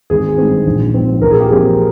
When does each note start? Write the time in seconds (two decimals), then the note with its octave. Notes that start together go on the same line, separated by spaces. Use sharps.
0.10 G#1 G#4
0.38 G2 D#3 G#3 C4
0.66 A#1
0.94 G#2 F3 C4
1.21 A#1 A#4
1.31 G#4
1.40 G4
1.49 A#2 F3 C4 G#4